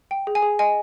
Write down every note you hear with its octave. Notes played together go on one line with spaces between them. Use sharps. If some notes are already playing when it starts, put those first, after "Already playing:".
G5
G#4
G#5
G#4
D#5 G#5